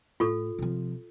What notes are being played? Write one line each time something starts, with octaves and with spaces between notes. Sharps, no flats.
A2 F4 A4
C3 F3